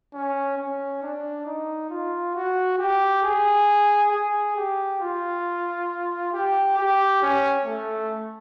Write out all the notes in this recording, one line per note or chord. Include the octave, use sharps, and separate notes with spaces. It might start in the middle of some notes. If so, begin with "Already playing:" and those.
C#4
C#4
D4
D#4
F4
F#4
G4
G#4
G#4
G4
F4
G4
G4
C#4
A3